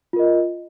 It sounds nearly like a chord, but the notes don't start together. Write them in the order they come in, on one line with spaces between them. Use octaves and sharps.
F4 A#4 D#5